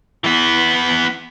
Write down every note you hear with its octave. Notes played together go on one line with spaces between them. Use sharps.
E3 B3